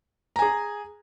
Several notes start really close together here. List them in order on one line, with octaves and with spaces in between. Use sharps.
A#5 G#5 G#4